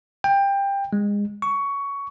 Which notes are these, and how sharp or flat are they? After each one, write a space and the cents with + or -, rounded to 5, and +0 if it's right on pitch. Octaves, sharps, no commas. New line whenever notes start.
G5 +20
G#3 -25
C#6 +15